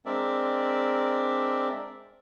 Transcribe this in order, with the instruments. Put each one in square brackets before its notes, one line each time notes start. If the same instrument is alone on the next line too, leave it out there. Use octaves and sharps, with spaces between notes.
[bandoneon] G#3 C4 D4 A#4 D5 E5